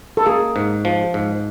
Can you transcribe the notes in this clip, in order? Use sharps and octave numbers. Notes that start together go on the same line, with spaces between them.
A4
A#3 G#4
G#2
F3
G#2